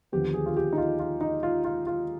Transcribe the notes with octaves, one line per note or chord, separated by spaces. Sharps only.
D#2 D3 F3 B3 G4
G#4
F4
G4
D#4
F4
F4
D#4
F4
F4
F4